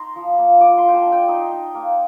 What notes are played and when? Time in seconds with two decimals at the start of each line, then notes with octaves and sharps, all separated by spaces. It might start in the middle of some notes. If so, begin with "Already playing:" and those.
Already playing: D#4 A#5 C6
0.16 F3
0.38 A#3
0.61 F4 D6
0.78 C6
0.83 F4
0.88 G5
0.94 A5
1.06 D4
1.12 G5
1.28 D#4 D#5
1.52 D#4
1.75 A#3